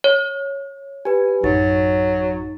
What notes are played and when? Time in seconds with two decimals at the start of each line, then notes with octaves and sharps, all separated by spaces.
0.04 C#5
1.05 G4 B4 G#5
1.43 A1 F#2 F#3 D#4 A6